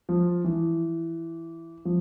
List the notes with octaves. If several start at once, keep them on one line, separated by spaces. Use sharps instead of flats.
F3
E3
F3